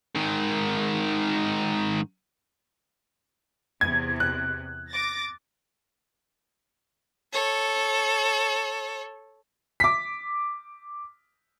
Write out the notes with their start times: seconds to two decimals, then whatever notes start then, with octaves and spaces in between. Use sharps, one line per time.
0.16 G#2 D#3
3.81 E2 C3 G#6
4.20 F#6
4.90 D6 A6 A#6
7.32 A4 C#5
9.80 D6 B6